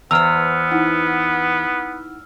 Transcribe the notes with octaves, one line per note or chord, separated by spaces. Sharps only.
E2 B3 C5 E6 F6 F7
D#4 E4 F#5